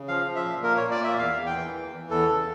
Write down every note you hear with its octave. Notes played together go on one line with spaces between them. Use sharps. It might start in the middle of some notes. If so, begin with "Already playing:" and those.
Already playing: C#3
F3 F5
F3
E5
A#2
A#3 A#4
A#2 C#5
D5
A#3 E5
E2 F5
E2
G5
E3
E2
E3
E2 A4
C#3